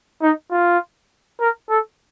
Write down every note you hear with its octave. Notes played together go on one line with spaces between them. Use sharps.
D#4
F4
A#4
A4